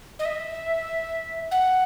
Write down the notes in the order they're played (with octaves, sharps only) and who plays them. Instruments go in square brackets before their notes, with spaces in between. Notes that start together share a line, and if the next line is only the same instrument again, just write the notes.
[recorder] D#5
E5
F#5